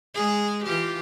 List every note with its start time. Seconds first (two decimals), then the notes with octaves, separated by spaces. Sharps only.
0.15 G#3 G#4
0.65 E3 F4 G4